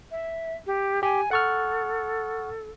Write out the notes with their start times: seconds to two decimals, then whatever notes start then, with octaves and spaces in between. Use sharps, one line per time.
0.11 E5
0.66 G4
1.03 G4 G#5
1.31 A4 F#5 C#6 F6